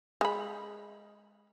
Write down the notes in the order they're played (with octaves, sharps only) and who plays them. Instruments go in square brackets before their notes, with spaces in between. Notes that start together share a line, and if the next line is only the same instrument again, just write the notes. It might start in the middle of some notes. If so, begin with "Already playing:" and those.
[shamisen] G#3 B5